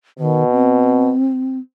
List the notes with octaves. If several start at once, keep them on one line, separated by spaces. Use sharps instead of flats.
B2 D#3
C4